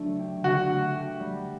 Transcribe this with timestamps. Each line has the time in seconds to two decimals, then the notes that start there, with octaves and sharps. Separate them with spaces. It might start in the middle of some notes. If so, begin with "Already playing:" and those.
Already playing: D3 F#3 A3 D4
0.19 G4
0.44 D3 F#4
0.70 A3
0.95 G4
1.20 G3